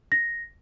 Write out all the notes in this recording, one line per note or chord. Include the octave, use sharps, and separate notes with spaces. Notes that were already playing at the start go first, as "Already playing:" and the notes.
A#6